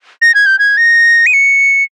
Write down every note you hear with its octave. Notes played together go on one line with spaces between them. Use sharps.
A#6
G#6
G6
G#6
A#6
D#7
C#7